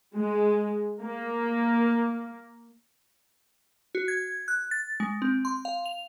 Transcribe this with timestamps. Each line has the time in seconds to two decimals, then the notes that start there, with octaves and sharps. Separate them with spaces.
0.14 G#3
1.02 A#3
3.95 F#4
4.08 G#6
4.48 F#6
4.71 A6
5.00 G#3
5.22 C4
5.45 C6
5.65 F5
5.86 F7